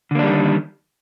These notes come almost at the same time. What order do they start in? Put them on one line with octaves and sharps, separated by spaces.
D3 A#3 D4 G3 D#3